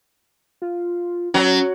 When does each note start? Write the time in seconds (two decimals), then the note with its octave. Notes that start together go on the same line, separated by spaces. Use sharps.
0.62 F4
1.34 F#3 C#4